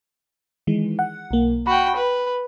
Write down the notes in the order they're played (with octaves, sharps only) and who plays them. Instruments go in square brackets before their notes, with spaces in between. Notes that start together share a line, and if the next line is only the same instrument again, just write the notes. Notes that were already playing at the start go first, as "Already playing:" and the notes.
[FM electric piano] D#3 E3 G#3
F#5
B1 A#3
[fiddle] F#4 G5 [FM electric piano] B5
[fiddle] B4